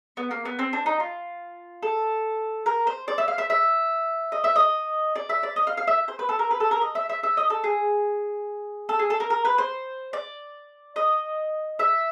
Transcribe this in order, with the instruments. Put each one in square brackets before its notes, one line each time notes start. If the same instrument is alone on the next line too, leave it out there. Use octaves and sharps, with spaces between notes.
[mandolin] B3
A#3
B3
C4
D4
D#4
F4
A4
A#4
C5
D5
E5
F5
E5
E5
D#5
E5
D#5
D5
E5
D5
D#5
F5
F5
E5
C5
B4
A4
A#4
B4
A4
A#4
D#5
E5
E5
E5
D#5
A4
G#4
A4
G#4
A4
A#4
A#4
B4
C5
D5
D#5
E5